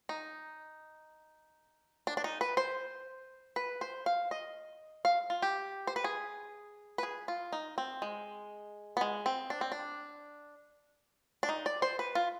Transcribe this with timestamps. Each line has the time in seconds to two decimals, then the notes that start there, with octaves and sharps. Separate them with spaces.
0.09 D#4
2.07 D4
2.17 D4
2.24 D#4
2.41 B4
2.57 C5
3.56 B4
3.81 C5
4.06 F5
4.31 D#5
5.05 F5
5.30 F4
5.42 G4
5.87 C5
5.96 B4
6.04 G#4
6.98 B4
7.03 G#4
7.28 F4
7.53 D#4
7.78 C4
8.02 G#3
8.97 B3
9.01 G#3
9.26 C4
9.50 D4
9.61 C4
9.72 D4
11.43 D4
11.49 D#4
11.66 D5
11.82 C5
11.99 B4
12.15 F4